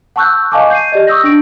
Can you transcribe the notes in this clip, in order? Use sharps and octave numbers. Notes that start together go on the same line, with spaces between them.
F#5 A5 C#6 E6 F#6 G6
D#5 F5 G#5 A5 C#6 D6
G6 C7 D#7
G4 D5 D#5
C#6 D#6 E6 G6 A#6
D4 D7